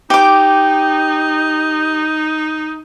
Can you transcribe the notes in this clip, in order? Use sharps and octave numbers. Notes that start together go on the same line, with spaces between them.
D#4 G4 D6